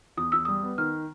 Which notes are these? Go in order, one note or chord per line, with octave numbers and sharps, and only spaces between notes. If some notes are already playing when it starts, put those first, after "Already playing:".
E2 D#6
E2 E6
G3 D#6
B3
D#3 F6